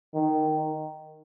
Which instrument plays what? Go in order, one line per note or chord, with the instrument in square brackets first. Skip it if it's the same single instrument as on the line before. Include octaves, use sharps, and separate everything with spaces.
[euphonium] D#3